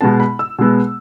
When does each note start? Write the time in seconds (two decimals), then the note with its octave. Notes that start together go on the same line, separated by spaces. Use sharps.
0.01 B2 G#3 B3 A5
0.20 B5
0.39 E6
0.59 B2 G#3 B3